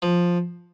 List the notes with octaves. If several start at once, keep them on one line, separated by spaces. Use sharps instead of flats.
F3